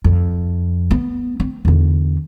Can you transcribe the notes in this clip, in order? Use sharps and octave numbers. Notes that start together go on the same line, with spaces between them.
F2
B3
C4
E2 D3